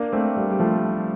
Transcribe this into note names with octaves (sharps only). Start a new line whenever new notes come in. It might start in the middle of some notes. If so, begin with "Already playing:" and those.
Already playing: A#3 D4
A3 C4
G3 A#3
G3
F3 A3